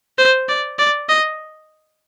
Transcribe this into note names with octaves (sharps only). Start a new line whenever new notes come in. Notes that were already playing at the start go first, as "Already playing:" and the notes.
C5
D5
D5
D#5